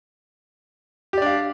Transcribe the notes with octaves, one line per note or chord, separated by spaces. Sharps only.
D4 G4 D5 F5